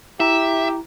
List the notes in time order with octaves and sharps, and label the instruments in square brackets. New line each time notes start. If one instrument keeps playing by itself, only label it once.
[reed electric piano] E4 A#5 [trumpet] G4 [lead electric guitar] E5